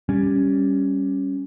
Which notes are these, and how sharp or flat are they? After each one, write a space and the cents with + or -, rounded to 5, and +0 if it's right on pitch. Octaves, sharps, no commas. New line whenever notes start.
G3 +0 C#4 +0